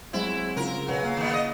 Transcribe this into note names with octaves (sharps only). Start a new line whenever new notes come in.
F#3 G#3 C4 E4
C#3 F4 A#4
B2 F#3 G#5
A#3 F5
D#3 B3
D#5